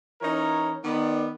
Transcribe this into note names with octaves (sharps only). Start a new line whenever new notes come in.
E3 C#4 D#4 E4 A#4 C#5
D#3 B3 D5